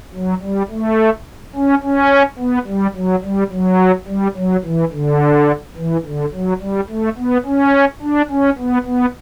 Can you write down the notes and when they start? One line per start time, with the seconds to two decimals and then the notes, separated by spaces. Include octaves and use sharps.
0.15 F#3
0.43 G3
0.71 A3
1.55 C#4
1.83 C#4
2.39 B3
2.68 G3
2.96 F#3
3.24 G3
3.52 F#3
4.08 G3
4.37 F#3
4.65 E3
4.93 D3
5.77 E3
6.06 D3
6.34 F#3
6.61 G3
6.90 A3
7.18 B3
7.46 C#4
8.02 D4
8.30 C#4
8.59 B3
8.86 B3